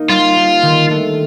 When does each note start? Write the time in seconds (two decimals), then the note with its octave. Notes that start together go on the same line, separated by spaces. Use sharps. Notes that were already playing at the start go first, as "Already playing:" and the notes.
Already playing: A#3 D#4
0.09 G3 F4
0.36 A#3 D#4
0.63 D#3
0.90 A3 D4 A4